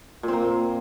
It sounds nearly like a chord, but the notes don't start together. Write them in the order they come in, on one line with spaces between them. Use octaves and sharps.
A#2 C4 A#3